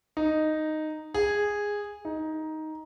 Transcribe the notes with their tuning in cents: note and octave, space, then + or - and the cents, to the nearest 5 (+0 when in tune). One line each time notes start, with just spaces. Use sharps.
D#4 -5
G#4 -10
D#4 +10